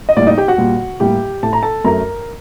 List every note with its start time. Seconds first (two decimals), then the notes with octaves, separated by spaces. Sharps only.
0.09 D#5
0.17 A2 G3 A#3 D5
0.27 D#4 D#5
0.37 G4 G5
0.48 F#4 F#5
0.58 A#2 G3 A#3
1.00 A2 G3 A#3 G4 G5
1.43 A2 A3 A5
1.53 A#5
1.63 A4 A5
1.84 F#2 F#3 A3 A#4 A#5